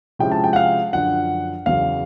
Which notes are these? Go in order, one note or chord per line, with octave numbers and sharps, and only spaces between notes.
C3 F3 G#3 C#4 E4 G5
A5
G5
F#5
F5
F#2 D3 F3 F#5
E2 C#3 F#3 F5